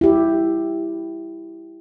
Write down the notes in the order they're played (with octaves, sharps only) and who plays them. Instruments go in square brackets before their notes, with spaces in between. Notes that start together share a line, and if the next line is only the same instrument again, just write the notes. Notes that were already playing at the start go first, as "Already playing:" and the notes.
[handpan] E4 G4